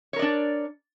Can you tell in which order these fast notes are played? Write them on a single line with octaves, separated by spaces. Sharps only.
C#5 A#4 D5 D4